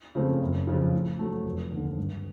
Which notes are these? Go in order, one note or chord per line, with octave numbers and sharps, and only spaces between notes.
C#3 F3 A3 C4
F#1
F2 C#3 F3
A2
F#3 A3
F1
D#2 D3
G2